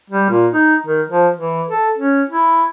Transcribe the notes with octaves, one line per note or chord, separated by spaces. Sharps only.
G3
A#2
D#4
D#3
F3
E3
A4
C#4
E4